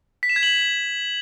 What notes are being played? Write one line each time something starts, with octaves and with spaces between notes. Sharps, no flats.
B6
E7
G#6
F#7